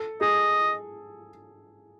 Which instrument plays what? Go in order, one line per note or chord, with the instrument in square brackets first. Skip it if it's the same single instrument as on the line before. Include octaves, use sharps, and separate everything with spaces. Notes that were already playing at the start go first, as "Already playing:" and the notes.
Already playing: [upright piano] A4
[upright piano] G#4 [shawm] D#5